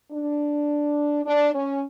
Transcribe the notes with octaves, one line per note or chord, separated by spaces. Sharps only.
D4
D4
C#4